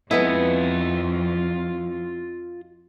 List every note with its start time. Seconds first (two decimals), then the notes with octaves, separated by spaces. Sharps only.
0.11 F2 G#3 B3 E4 F4 D#5